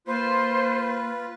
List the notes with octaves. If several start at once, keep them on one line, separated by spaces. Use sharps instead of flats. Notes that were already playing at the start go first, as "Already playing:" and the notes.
A#3 F4 B4 C5